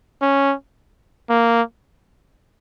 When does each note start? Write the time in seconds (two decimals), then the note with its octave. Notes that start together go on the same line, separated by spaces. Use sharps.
0.22 C#4
1.30 A#3